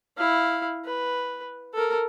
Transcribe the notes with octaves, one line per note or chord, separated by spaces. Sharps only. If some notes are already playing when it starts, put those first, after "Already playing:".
E4 F5
B4
A4 A#4